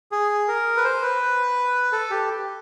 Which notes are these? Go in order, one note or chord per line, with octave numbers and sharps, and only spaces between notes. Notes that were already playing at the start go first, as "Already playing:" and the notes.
G#4
A#4
B4
C5
B4
A4
G4